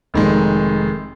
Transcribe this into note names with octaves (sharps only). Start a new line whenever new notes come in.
F1 D#3 G#3